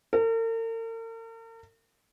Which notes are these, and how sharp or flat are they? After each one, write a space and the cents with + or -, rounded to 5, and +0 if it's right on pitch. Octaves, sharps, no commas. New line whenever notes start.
A#4 -45